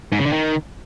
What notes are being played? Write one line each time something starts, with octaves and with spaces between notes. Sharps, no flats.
G#2
C#3
D3
D#3